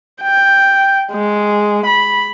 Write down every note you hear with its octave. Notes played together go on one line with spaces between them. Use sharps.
G5
G#3
B5